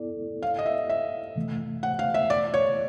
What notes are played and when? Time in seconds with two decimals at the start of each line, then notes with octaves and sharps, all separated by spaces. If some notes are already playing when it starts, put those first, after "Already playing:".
Already playing: B3 E4 A4 D5
0.43 F5
0.59 D#5
0.66 E5
0.90 E5
1.36 C3 E3 A3
1.83 F#5
1.99 F5
2.14 E5
2.30 D5
2.54 C#5